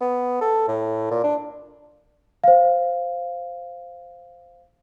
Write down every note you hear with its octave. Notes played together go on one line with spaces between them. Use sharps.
B3
A4
A2
A#2
D4
C5 F5